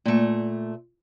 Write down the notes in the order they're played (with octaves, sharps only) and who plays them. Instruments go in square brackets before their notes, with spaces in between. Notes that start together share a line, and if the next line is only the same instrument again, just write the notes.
[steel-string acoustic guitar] A#2 A3